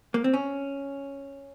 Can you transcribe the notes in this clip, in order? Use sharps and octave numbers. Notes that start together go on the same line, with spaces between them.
A#3
C4
C#4